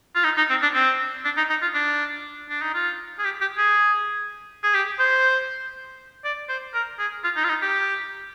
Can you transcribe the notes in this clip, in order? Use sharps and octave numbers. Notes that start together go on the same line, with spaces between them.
F4
D#4
D#4
C4
D4
C4
D4
D#4
D#4
F4
D4
D4
D#4
F4
G#4
G4
G4
G#4
G#4
G4
C5
D5
C5
A#4
G#4
F4
D#4
F4
D#4
G4